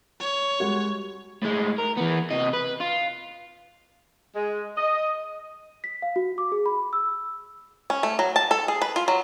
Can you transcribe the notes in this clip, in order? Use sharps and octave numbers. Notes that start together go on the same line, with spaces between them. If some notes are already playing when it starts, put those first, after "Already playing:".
C#5
G3 G#3 F#4
A2 G#3
A#4
E3 B3
C3 D#5
B4
F4
G#3
D#5
B6
F5
F#4
D6
G#4
B5
E6
C#4
A3
F#3
A5
A4
G#4
B4
F4
F#3